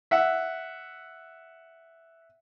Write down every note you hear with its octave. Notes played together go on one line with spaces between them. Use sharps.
E5 F#5